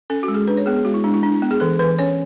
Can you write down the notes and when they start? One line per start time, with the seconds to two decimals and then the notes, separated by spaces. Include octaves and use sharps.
0.10 C#4 A4
0.23 F#4
0.28 G#3
0.34 G#4
0.47 D4 B4
0.57 C#5
0.66 B3 G#4
0.76 G#4
0.85 G#3 F#4
0.94 E4
1.04 G#3 D4
1.14 E4
1.23 D4
1.32 E4
1.42 B3
1.51 G#4
1.60 E3 A4
1.79 E3 B4
1.99 C#4 C#5